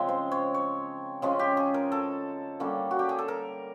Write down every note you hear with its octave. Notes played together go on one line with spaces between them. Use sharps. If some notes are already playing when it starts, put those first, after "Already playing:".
Already playing: C#3 F3 G#3 C4
C5
C#5
C#5
C#3 F3 G#3 C#4 G#4
G4
G#4
A#4
A4
D3 G3 A#3 C#4
F#4
G4
G#4
A4
A#4